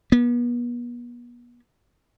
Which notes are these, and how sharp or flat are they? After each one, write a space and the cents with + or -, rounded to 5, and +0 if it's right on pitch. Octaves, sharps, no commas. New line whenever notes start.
B3 -40